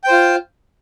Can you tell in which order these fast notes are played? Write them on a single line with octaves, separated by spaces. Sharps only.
G5 C5 F4